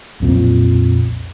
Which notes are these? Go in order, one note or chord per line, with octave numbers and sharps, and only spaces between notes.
B1 F2 A#2